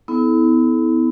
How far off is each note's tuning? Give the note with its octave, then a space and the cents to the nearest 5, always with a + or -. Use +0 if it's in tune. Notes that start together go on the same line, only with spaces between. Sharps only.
B3 +25 E4 -35 A4 -30